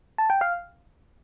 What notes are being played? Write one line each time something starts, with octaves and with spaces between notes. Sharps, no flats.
A5
G5
F5